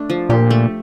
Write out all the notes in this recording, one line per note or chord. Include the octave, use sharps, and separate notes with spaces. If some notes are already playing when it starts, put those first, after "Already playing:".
Already playing: A3 D4
F3
A#2 G4
A3